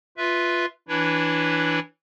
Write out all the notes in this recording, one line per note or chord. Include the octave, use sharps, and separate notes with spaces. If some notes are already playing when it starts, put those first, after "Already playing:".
F4 B4 E5
E3 D4 E4 B4 C#5